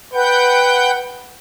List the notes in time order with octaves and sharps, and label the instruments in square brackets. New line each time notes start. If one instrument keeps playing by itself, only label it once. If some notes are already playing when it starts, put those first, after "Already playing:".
[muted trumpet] B4 [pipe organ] F#5 G5 G6